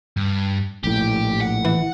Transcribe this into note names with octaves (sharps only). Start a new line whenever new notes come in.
G2
A#1 A2 G4
F#5
E3